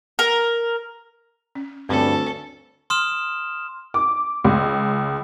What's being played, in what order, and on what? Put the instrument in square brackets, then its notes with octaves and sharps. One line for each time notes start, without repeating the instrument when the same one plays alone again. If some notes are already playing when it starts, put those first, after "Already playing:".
[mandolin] A#4
[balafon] C#4
[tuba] D2 [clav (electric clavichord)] G2 [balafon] C4 G5 [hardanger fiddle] C#4 A4
[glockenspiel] C6 D#6 F6 E7
[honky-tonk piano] D6
C#2